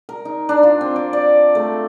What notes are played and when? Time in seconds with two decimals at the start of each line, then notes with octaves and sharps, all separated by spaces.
0.09 A#4
0.25 D#4
0.49 D4
0.63 F4
0.81 C4
0.96 D6
1.13 D5
1.55 A3